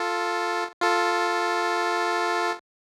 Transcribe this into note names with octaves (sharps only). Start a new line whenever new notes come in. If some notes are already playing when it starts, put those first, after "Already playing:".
Already playing: F4 A4
F4 A4